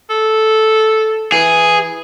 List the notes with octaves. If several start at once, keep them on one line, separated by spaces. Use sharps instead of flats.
A4
E3 G#4